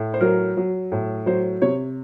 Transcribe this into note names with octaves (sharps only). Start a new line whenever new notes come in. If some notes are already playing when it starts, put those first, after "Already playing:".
Already playing: A2
C5
F#3 A#4
F#3
A2
F#3 C5
C3 C#5